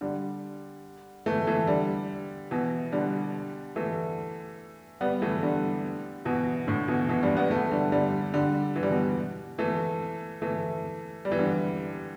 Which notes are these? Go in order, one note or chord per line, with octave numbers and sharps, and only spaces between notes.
D3 G3
E3 A3
E3 A3
D3 G3
B2 E3
D3 G3
E3 A3
G3 B3
E3 A3
D3 G3
B2 E3
A2 D3
B2 E3
B2 E3
D3 G3
G3 B3
E3 A3
D3 G3
D3 G3
D3 G3
E3
G3
B2 E3
E3 A3
E3 A3
G3
E3
D3 G3